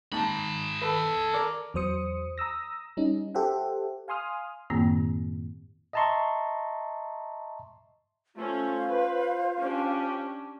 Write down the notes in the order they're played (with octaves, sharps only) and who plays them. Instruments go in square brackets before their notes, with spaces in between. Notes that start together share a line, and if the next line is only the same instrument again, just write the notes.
[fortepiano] G#2 A5 [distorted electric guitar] G#4 B5
[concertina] A4 [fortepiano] B4
[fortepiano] A#4 D5
[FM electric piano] E2 F#3 C5 D#6 C#7
A#5 D#6 E6 A#6
G3 C#4 D#4
G4 A4 C5 E5 F#5
F5 G#5 C6 D#6 F6
[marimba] F#2 A2 D#3 A#3 C4
[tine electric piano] D#5 E5 A5 A#5 C6 C#6
[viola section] A3 C#4 [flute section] F4 C5 F5
[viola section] B4
C#4 D4 G4